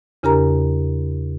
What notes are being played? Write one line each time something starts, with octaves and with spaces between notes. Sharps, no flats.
E2 C#3 D4 G4 A#4 A#5